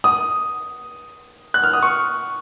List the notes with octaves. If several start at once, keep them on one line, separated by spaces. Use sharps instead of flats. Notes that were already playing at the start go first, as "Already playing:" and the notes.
D#6
F#6
F6
D#6
C#6